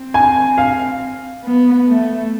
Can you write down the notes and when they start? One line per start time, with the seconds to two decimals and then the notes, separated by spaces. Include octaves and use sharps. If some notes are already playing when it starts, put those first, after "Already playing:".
Already playing: C4
0.14 G#5
0.58 F5
1.44 B3
1.88 A3